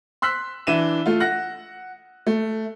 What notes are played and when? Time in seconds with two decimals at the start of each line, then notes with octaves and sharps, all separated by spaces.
0.22 C6 E6 F#6 B6
0.67 E3 D4 E5 D#7 E7
1.06 A3 F4
1.20 F#5 F#6 A#6
2.27 A3